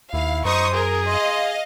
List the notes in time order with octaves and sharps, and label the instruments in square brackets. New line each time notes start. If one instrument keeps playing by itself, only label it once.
[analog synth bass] D#2 [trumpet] E4 [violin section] F5
[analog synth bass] F#2 [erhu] D#4 [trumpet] C5 [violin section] C#6 D#6
[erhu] G#4 [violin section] A#4
[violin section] D#5 F5 [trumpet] C6